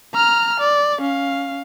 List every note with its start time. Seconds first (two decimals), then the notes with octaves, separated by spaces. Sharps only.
0.14 A#5 F6
0.60 D5
1.01 C#4 F5